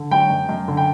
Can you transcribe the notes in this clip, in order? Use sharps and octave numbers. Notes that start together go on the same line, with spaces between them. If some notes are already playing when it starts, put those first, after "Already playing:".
Already playing: D3
F#3 G5
F#2
F#2
D3
G5